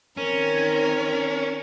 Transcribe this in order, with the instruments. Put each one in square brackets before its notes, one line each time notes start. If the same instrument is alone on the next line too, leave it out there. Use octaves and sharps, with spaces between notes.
[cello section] D#3 C4 [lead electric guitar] C#4 [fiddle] A#4